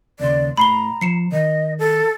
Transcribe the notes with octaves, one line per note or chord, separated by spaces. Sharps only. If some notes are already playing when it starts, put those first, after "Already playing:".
D#2 C#3 D5 C6
A2 A#5 B5 C7 G7
F3 C7 C#7 E7
D#3 D#5
A4